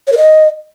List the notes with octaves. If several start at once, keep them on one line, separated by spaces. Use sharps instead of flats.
C#5
A#4
D#5